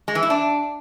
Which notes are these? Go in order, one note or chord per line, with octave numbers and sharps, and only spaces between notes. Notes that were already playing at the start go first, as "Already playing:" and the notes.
G#3
E3
E4
D4